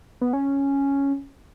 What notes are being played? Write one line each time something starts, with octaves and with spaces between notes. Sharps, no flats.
B3
C#4